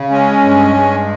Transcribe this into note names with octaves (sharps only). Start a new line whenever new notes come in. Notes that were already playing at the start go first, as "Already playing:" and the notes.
Already playing: C#3
G#3 C#4
G2
G#3